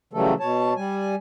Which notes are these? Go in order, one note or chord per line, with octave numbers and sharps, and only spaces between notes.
C#3 E3 F#3 G3 A3 A4
B2 C#5 A5
G3 G#5